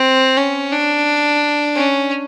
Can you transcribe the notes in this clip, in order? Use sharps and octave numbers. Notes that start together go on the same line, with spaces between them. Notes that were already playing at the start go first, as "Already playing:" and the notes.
Already playing: C4
C#4
D4
C#4